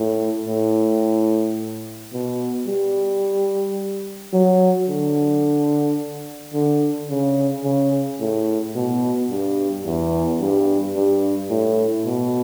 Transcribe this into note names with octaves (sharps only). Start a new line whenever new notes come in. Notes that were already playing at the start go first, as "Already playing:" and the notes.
Already playing: A2
A2
B2
G3
F#3
D3
D3
C#3
C#3
A2
B2
G2
E2
G2
G2
A2
B2